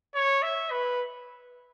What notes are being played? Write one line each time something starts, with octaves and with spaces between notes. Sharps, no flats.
C#5
E5
B4